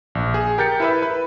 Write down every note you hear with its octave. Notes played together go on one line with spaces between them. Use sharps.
A#1
G#4
G4 A#4 G6 A6 C#7
E4 B4 E5
B4